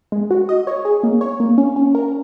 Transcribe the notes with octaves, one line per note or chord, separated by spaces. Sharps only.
G#3
F#4
D#5
C#5
G#4
A#3
C#5
A#3
C#4
C#4
A#4